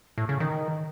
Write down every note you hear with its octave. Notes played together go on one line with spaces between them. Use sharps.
A2
C#3
D#3